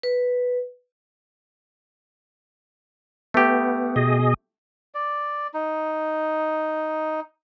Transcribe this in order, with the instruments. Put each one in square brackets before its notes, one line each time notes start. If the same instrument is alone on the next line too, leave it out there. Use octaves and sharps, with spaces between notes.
[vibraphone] B4
[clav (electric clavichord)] A3 G4 [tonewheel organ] B3
[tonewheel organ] B2 G#4 D#5
[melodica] D5
D#4